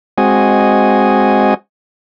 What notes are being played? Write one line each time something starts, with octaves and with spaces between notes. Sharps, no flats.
G#3 C4 F#4 D#5 G#5